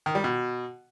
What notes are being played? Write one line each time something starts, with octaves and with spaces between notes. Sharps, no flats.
D#3
G3
B2